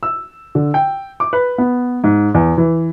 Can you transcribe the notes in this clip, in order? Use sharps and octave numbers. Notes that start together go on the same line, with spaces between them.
E6
D3
G5
D6
B4
B3
G#2
E2
E3